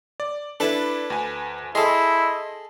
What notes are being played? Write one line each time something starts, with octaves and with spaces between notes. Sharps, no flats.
D5
D4 E4 A4 B4 A5
D2 G#5
E4 G#4 A4 D#5 C6 E6